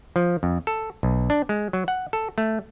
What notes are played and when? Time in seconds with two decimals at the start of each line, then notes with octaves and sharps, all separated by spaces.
0.16 F3
0.43 F2
0.67 A4
1.03 B1
1.30 D4
1.49 G#3
1.73 F#3
1.88 F#5
2.13 A4
2.38 A3